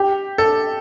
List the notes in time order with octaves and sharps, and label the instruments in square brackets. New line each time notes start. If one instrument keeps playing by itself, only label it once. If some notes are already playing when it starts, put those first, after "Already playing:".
Already playing: [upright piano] G4
A4